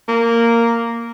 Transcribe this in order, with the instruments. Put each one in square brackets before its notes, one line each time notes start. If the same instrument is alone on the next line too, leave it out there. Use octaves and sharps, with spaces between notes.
[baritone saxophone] A#3